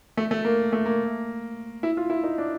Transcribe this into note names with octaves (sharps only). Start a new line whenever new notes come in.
A3
A3
A#3
A3
A#3
E4
F4
E4
D#4
D4